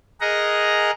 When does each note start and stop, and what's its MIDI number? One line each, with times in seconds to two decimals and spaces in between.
0.21 0.91 68
0.21 0.91 70
0.21 0.91 75
0.21 0.91 78
0.21 0.91 82